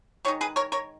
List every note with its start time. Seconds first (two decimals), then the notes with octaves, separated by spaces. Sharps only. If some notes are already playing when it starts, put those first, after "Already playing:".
0.25 D#3 G#3 D#4 C#5
0.41 G#4 B4
0.56 A#4 C#5
0.72 A#4 C#5